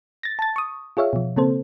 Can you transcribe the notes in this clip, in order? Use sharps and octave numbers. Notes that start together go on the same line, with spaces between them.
A6 A#6
A5 A6
C#6 D#6
F4 G#4 C#5 E5 F5
B2 F3
C#3 A#3 C4 A4 C5